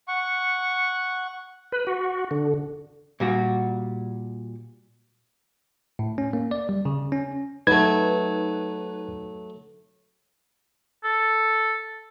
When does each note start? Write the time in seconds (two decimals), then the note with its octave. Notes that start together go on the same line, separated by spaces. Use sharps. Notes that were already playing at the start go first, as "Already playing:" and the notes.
0.08 F#5 C#6
1.72 B4
1.87 F#4
2.31 D3
3.20 A#2 G3 F#4
5.99 A2
6.18 C#4
6.33 A#3
6.51 D5
6.69 G3
6.85 C#3
7.12 C#4
7.67 F#3 A3 D#4 B4 G#6
11.04 A4